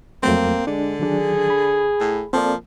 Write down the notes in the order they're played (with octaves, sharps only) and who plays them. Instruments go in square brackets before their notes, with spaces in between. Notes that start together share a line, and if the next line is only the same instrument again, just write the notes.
[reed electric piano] F2 F#3 A3 [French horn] A#3 [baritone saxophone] C4
[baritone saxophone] D3 [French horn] G#3 [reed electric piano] D4
[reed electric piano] D#3 F#3 D4 [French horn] G#4
[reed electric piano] B5
[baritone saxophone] A2
[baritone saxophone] F3 [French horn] A#3 [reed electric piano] C4 A4 D5